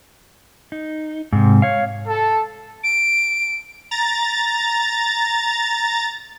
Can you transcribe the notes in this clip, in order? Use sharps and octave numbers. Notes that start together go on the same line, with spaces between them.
D#4
G#2 C3
C#5 F5
A4
D7
A#5 A6